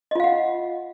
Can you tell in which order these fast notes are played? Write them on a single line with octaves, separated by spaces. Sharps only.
D#5 F4 F5 F#5